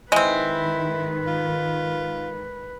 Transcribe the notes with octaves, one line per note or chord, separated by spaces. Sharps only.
G#2 D#3 G#3 C4 E4 B4
F4